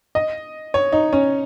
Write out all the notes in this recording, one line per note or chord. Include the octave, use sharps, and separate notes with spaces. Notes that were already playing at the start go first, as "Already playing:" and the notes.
D#5
C#5
D#4
C#4